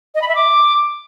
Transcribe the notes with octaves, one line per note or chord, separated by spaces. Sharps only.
D#5
B5
E5
D6